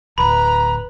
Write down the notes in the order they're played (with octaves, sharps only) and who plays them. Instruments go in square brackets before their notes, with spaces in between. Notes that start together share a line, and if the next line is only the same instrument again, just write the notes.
[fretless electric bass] D1 [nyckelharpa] B4 [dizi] A#5 [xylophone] B5